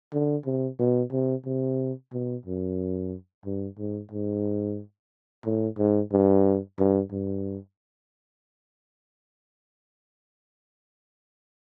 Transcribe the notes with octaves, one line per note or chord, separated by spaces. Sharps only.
D3
C3
B2
C3
C3
B2
F#2
G2
G#2
G#2
A2
G#2
G2
G2
G2